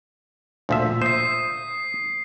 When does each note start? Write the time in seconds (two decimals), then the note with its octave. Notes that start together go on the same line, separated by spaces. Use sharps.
0.69 D2 A#2 F3 E5
1.02 C5 E5 D#6 C7